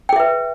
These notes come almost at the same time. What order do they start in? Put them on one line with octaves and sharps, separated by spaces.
G5 G#4 E5 B4